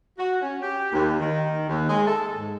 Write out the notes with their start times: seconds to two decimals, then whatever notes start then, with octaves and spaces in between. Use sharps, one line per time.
0.19 F#4
0.42 C#4
0.61 G4
0.93 D#2
1.20 D#3
1.68 D#2
1.89 G#3
2.07 A4
2.37 G#2